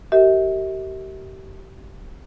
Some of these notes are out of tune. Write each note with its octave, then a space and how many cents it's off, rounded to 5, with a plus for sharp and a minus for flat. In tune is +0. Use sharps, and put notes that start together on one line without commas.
G4 -30 A#4 -30 E5 -40